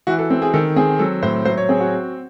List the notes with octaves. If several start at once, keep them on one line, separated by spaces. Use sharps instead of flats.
E3 F#4
A4
C4
G#4
D#3 A4
C4 G#4
F#3 A4
A2 C5
F#3 C5
C#5
C4 G#4
F#4